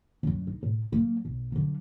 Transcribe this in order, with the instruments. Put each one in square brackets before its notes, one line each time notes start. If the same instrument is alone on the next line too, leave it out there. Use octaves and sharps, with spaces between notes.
[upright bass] F#2 F#3
D#4
A2
F#3 A#3
B1
D3 F#3